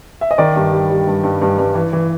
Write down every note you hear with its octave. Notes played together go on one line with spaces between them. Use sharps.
E5
D#5
D#3 D5
G2
G3
G3
G2
G2
G2
G2
E3
E3